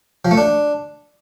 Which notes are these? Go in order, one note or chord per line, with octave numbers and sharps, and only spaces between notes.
F3
A3
D4